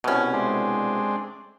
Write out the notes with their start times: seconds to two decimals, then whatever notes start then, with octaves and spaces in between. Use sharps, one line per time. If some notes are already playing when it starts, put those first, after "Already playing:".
0.04 C2 B2 A3 C#4
0.33 G#3 C4 D4